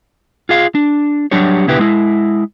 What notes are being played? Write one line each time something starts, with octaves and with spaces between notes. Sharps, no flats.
F4 G#4 F5
D4
F#3 G3 D4 G4 C#5
C#2 B2 D3 E4 G4 B4
G#3 E4